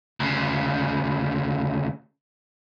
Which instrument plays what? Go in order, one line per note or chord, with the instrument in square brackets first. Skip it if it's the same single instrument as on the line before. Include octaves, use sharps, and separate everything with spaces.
[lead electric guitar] D2 C#3